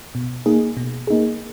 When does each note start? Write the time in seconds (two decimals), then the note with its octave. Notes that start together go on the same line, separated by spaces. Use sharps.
0.15 B2
0.46 A#3 D#4 G#4
0.77 B2
1.07 A#3 D#4 G#4